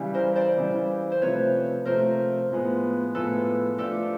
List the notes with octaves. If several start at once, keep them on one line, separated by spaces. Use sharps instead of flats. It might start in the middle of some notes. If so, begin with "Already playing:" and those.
Already playing: C#3 E3 G3
A#4 C5
C5 D5
C#3 E3 G3
C5
C3 F3 A3 B4 C#5
C3 F3 A3 A#4 C5
A2 F3 G#3 B3
A2 F3 G#3 B3 A4 B4
F3 A3 D4 F4 G4 A4